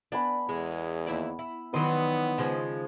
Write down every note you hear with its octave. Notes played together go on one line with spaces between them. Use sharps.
B3 D4 G#5 B5
E2 G#3
D#2 E4 D5
E4
D#3 E3 F#3 G3 B3 B4 D#5 C6
C#3 F3 G#3